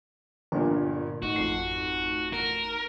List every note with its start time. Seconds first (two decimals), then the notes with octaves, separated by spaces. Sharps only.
0.52 G1 G2 A#2 A#4
1.22 G#1 A3 D#4 F#4
1.36 F2 C7
2.33 A#4